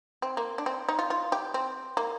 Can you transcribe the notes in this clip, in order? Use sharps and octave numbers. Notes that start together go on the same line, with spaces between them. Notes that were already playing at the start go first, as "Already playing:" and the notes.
C4
A#3
D4
C4
D#4
F4
F4
G4
C4
A#3